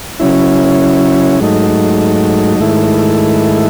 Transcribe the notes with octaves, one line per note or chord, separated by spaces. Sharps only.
C#3 F#3 C#4 E4
G#2 F#3 A3 D#4
G#2 D#3 A3 E4